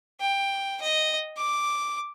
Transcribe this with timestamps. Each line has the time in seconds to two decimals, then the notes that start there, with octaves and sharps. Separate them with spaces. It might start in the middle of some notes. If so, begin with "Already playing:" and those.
0.20 G5
0.81 D#5
1.37 D6